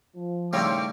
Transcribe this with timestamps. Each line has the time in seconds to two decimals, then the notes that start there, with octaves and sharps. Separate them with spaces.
0.16 F3
0.53 D#2 A2 C#3 G3 C4 C#5 D6